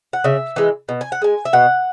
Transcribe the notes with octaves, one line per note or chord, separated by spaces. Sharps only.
F#5
C#3 E5
E3 G#3
B2
G#5
F#5
G#3 G#5
E5
B2 F#5